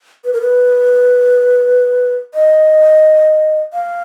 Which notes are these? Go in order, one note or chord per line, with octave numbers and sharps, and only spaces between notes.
B4
A#4
B4
D#5
F5